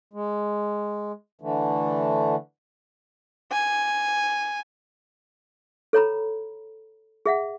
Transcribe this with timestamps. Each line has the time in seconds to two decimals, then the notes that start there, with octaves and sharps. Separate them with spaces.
0.13 G#3
1.41 D3 E3 A3
3.52 G#5
5.93 A4 C#5 A#5 B5
7.26 G#4 E5 F#5